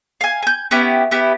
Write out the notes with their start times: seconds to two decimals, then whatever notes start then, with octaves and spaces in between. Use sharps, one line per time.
0.21 F5 G#5
0.43 G#5 G6
0.71 B3 C#4 E4 G4
1.11 B3 E4 G4